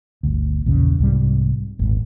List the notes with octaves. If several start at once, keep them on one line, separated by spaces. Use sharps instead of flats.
G1 D2
A#1 E2 C#3
C2 G#2 G3
D#1 G#1